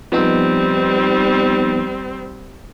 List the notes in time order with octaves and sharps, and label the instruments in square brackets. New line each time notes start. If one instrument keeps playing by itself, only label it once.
[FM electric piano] F3 B3 D#4 [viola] G3 C4